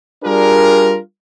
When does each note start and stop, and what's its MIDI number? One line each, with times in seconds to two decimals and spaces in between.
0.24 0.97 55
0.24 0.97 62
0.24 0.97 65
0.24 0.97 68
0.24 0.97 70